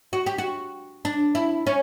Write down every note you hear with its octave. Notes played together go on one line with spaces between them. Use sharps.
F#4
G4
F#4
D4
E4
C#4